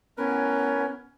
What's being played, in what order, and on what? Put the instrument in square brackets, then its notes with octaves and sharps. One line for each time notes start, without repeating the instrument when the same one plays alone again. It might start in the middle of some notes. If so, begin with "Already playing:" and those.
[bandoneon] A2 A#4 B4 [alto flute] B3 [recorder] C#4